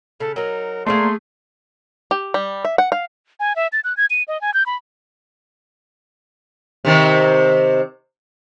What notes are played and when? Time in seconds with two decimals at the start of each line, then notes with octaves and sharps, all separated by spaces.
0.20 C#3 A4
0.36 F#3 D#4 A#4
0.86 A3 A#3 G#4 C5 D5 C6
2.11 G4
2.34 G3
2.65 E5
2.78 F#5
2.92 F5
3.40 G#5
3.56 E5
3.73 A6
3.84 F#6
3.97 G#6
4.10 D#7
4.28 D#5
4.41 G#5
4.54 G6
4.66 B5
6.85 C3 D#3 C4